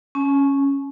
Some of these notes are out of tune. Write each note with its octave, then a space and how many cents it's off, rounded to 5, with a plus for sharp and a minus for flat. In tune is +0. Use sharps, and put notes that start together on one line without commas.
C#4 -5 G#5 +45